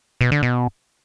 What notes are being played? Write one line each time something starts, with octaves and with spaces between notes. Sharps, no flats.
B2
D3
B2